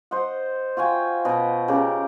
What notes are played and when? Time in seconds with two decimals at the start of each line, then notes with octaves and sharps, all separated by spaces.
0.11 C5 D#5 F#5
0.77 F4 F#4 G5 G#5
1.25 B2 D#5 G5 B5
1.68 C#3 G4 A#4